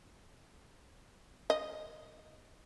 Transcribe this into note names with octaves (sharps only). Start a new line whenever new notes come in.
D#5